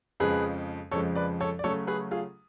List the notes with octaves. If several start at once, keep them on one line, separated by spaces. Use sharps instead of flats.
F2 C#3 F3 G#3 G#4 B4
F2 C#3 F3 G#3 A4 C#5
B4 D5
A4 C#5
D5
C#3 F#3 A3 C#4 A4 C#5
G#4 B4
F4 G#4